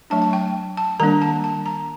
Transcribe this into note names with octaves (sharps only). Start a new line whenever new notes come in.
F#3 A3 D4 A5
A5
G5
A5
D#3 G3 A#3 D4 A#5
A5
A5
A#5